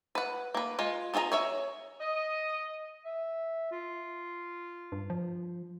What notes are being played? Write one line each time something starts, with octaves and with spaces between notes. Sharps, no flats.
B4 F#5
A#3 B4
G#3 F4
B3 F4 G#4 E5 A#5
G#4 C#5 E5
D#5
E5
F4
G2
F3